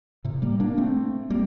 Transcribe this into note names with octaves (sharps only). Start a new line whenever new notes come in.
A2 C3
G3 A#3
A#3 D4
A3 C4
G3 A#3